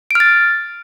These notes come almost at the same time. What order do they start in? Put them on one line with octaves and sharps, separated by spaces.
D7 F6 A6